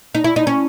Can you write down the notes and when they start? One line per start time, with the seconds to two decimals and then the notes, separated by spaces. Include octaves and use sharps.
0.15 D#4
0.24 E4
0.36 D#4
0.47 C#4